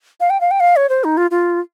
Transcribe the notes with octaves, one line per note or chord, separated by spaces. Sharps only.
F5
G5
F5
G5
F5
C#5
C5
D#4
F4
F4